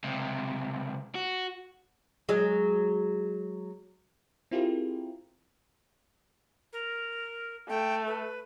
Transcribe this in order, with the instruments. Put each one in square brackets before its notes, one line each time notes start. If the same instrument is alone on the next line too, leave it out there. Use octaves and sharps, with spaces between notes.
[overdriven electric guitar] C#2 C3
F#4
[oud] F#3 G#3
[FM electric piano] C4 E4 F4 G4 G#4 A#4
[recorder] A#4
[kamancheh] A3 [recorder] G5
[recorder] B4